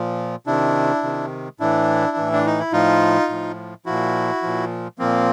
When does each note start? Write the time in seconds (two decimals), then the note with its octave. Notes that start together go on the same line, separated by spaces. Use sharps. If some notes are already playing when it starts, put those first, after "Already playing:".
Already playing: A#2 F3
0.47 C3 D#3 D4 E4
1.03 C3 D#3
1.60 A2 E3 D4 E4
2.17 A2 E3
2.33 D4
2.46 D#4
2.59 E4
2.73 A2 F3 D#4 F4
3.29 A2 F3
3.86 A#2 F3 E4 F#4
4.43 A#2 F3
4.99 A#2 F3 A#3 C4